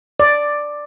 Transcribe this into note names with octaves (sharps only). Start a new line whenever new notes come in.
D5